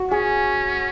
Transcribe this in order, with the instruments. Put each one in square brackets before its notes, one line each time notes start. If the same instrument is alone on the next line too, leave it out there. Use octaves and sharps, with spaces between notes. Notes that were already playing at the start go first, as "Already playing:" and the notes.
Already playing: [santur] F#4
[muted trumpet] C#4 [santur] G#4